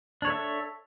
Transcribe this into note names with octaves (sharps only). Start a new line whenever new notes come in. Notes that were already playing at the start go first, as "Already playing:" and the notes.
D4 A4 C#5 E5